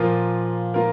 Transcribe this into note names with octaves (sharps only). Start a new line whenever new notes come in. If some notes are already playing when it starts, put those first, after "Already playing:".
Already playing: A#2 F3 A#3 F4 A#4
A#3 F4 A#4